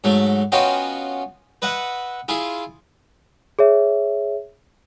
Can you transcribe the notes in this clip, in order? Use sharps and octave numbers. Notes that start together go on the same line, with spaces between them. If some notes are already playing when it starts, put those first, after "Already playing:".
G#2 F#3 A3
B3 C#4 F4 F#4 D#5 G5
B4 D#5 E5 F#5
E4 F4 G#4
G#4 C#5 E5